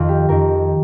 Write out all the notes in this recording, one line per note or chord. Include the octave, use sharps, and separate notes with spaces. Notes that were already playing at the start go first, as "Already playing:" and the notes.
Already playing: F2 D#3 F4
G4
F2 D#3 A#4